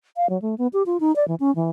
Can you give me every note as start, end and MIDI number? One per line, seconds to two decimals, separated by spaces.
0.17 0.29 77
0.30 0.40 54
0.42 0.55 57
0.58 0.67 59
0.73 0.83 67
0.86 0.97 65
1.00 1.14 63
1.16 1.27 74
1.28 1.35 52
1.40 1.54 61
1.56 1.71 52